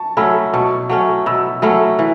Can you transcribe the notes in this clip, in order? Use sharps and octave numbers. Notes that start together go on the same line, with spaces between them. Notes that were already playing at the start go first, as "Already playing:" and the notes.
Already playing: A5 C#6
F#3 A3 C#4 B5 E6
B2 A5 C#6
F#3 A3 C#4 A5 C#6
B2 B5 E6
F#3 A3 C#4 B5 E6
E3